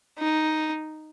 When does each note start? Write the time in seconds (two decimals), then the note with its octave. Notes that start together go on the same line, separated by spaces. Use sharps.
0.19 D#4